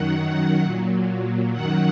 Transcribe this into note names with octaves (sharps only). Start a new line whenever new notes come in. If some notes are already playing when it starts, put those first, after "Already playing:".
Already playing: F#2 D#3 F#3 F#5
A#2 F#3
F#2 D#3 F#3 F#5